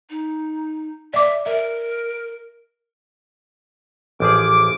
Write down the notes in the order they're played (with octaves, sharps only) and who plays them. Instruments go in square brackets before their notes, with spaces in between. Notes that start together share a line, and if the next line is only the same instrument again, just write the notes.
[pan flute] D#4
[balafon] D5 D6 [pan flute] E5
[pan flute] A#4 [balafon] E5
[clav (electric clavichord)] A1 F3 G#4 [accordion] D6